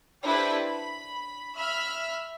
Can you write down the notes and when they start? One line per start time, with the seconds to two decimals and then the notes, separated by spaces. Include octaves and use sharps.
0.22 D4 E4 G4 A4 B4 C5
0.65 B5
1.56 E5 B5 E6 F6